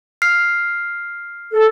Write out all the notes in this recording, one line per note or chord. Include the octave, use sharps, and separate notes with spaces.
F6 C7
A4